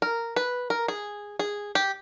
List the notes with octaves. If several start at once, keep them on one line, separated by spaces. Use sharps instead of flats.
A#4
B4
A#4
G#4
G#4
G4